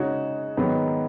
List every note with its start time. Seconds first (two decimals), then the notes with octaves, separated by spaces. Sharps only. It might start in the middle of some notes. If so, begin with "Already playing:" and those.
Already playing: C#3 G#3 D#4 F#4 C#5
0.57 G#2 D#3 F#3 B3